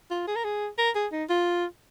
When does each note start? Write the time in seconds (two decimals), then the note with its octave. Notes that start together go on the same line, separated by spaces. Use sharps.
0.11 F4
0.27 G#4
0.36 A#4
0.44 G#4
0.78 A#4
0.95 G#4
1.12 D#4
1.29 F4